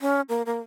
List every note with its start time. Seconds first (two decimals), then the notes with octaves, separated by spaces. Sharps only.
0.01 C#4
0.29 A#3
0.46 A#3